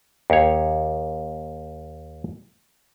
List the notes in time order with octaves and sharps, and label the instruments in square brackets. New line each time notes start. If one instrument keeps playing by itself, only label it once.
[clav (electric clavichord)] D#2 C#5